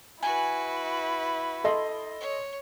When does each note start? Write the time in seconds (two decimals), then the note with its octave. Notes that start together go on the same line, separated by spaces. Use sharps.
0.23 E4 F#4 B4 G#5
1.64 A4 D#5 C6
2.20 C#5